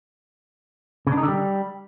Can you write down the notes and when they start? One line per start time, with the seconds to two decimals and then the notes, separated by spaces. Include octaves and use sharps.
1.07 C#3
1.12 D4
1.17 D#4
1.23 D3
1.28 G3